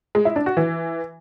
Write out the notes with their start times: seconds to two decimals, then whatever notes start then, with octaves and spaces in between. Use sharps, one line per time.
0.15 G#3
0.25 E4
0.36 D4
0.46 F#4
0.57 E3